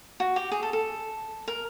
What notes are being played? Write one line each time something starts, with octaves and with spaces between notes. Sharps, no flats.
F#4
G4
G#4
A4
A4
A#4